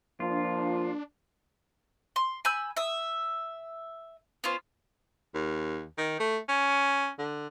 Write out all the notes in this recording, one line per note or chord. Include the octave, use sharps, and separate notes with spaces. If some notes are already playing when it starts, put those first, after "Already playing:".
F3 A#3 D4 F4
C6
G#5 B5 E6 G6
E5 D#6
B3 C#4 F4 C5
D#2
D#3
A3
C#4
D3